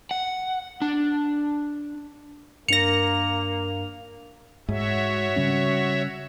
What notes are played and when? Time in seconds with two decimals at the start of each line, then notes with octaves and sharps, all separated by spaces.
0.11 F#5
0.82 D4
2.68 G2 A#3 D4 A#4 A#6 C#7 F7
4.69 G#2 F#4 C#5 E5
5.36 C#3 G3 C#4